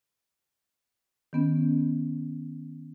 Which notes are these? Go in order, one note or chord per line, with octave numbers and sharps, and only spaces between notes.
D#3 B3 C#4